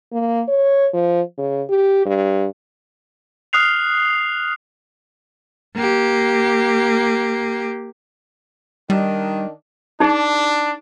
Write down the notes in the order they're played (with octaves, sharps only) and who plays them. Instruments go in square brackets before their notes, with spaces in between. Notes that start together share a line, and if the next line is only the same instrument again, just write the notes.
[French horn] A#3
C#5
F3
C#3
G4
G2
[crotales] D#6 F6 F#6 C7 F7
[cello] A#3 G4
[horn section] D#3 D4 [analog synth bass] G3
[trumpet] D4 [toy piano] D#4 G#4